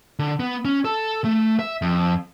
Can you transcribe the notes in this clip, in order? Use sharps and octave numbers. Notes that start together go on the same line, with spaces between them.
D3
B3
C#4
A4
A3
E5
F2